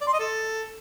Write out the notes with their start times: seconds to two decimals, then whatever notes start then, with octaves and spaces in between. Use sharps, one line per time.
0.01 D5
0.07 C6
0.13 D#5
0.19 A4